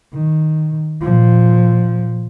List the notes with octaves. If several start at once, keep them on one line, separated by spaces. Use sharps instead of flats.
D#3
A#2 F3